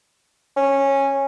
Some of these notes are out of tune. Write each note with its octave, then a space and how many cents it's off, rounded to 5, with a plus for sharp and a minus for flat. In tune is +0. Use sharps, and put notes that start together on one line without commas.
C#4 -15